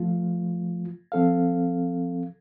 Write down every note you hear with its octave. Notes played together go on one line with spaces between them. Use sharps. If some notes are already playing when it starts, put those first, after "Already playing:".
Already playing: F3 A3 F4
F3 C4 A4 F5